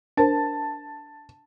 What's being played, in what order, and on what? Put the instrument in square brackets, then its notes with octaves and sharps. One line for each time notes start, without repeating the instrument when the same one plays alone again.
[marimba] D4 A#4 C5 [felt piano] A5